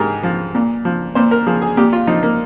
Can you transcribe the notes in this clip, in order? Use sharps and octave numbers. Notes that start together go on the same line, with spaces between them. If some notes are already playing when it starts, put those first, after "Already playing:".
Already playing: G#2 G4 G#4 A#4
F3
A#2
F3
A#2 C5
A#4
F3 G#4
G#4
A#2 G4
F4
F3 D#4
A#3